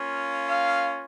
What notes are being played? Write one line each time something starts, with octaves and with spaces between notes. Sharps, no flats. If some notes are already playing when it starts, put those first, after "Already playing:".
Already playing: A#3 C#4 F4
F5